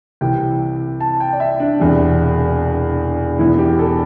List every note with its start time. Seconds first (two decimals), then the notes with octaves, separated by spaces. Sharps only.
0.21 C2 C3 E3 G5
1.00 A5
1.20 G5
1.33 D5
1.40 E5
1.60 D4
1.79 E1 E2 C3
3.39 E1 E2 E3 E4
3.59 G4
3.79 A4